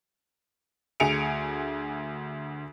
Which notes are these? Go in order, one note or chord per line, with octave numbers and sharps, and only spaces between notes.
D2 G#4 G#5 C#7 D7 F7